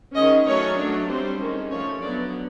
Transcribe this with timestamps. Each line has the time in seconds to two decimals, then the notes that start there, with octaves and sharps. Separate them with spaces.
0.15 D#3 G#3 C#4 D#5
0.46 F#3 A3 C#4 C#5
0.77 F#3 A3 D4
1.08 G3 C4 C5
1.39 D#3 G#3 C#4
1.70 F3 A3 C#4 C#5
2.01 D3 F#3 B3 D5